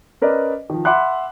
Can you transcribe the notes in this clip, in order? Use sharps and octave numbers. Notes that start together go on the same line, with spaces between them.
C#4 A#4 B4 D5 D#5
D#3 F3
E5 F#5 B5 C6 D6 F#6